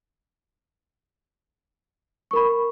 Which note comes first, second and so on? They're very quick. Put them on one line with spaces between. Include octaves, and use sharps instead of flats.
C#6 A#4 B5